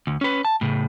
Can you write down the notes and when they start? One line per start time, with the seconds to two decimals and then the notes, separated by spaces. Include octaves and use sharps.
0.07 D2
0.21 C#4 B4
0.45 A5
0.61 A2 C#3